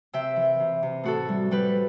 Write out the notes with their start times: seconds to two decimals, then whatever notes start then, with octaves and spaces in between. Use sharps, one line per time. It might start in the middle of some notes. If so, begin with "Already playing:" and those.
0.13 C3 E5 G5
0.36 E3
0.60 C3
0.83 C3
1.04 A2 F#4 A4
1.29 G3
1.51 G3 G4 B4